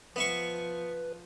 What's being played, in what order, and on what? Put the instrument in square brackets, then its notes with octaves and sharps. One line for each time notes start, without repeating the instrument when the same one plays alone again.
[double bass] F3 [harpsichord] B3 E5 C#6 [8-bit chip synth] B4